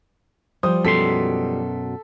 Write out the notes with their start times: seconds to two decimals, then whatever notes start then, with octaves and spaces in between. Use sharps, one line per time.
0.63 F3 G3 C5 D#6
0.85 F#2 B2 A4 C6 B6